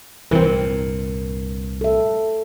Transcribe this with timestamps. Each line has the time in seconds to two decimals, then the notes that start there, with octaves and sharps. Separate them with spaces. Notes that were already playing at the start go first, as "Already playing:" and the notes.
0.31 C2 G2 A#2 E3 C4 A#4
1.81 A4 E5